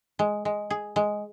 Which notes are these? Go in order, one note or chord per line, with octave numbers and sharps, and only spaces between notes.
G#3
G#3
G#4
G#3